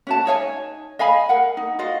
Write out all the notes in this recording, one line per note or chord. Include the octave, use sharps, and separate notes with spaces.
C#4 F#4 A5
D#4 C#5 F5 G#5
D#5 F5 G#5 B5
A#4 F#5
D#4
F4 F#4 D#5 F5